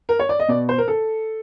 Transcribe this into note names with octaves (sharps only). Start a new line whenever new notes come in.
A#4
C#5
D5
D#5
B2 D5
C5
A#4
A4